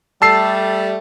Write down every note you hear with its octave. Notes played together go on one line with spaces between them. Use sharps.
G3 A3 A5 E6 C7